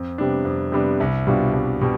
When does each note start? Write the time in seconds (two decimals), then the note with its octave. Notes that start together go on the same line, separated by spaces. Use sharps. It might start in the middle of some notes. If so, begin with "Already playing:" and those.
Already playing: F2
0.18 C3 G3 B3 D4
0.45 F2
0.72 C3 G3 B3 D4
1.00 C2
1.27 B2 G3 D4 F4
1.54 C2
1.81 B2 G3